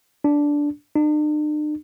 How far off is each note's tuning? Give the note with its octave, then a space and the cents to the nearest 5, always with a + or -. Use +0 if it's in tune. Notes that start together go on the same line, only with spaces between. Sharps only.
D4 -10
D4 +45